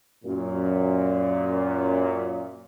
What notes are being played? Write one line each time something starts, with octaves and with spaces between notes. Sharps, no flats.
F#2 A#2